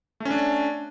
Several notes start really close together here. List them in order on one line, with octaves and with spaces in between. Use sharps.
A3 C#4 D4